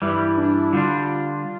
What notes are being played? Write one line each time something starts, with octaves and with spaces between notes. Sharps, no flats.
G2 E3 G3 E4
D4
E4
D3 G3 D4 F4